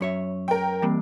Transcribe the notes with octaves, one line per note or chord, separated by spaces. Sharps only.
F#2 C#5 E5
A#4 G5
E3 G3 A#3 C4